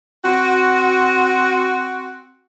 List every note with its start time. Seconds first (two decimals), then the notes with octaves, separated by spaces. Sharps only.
0.24 C4 F#4